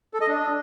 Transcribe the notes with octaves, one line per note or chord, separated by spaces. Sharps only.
A4
D#5
D4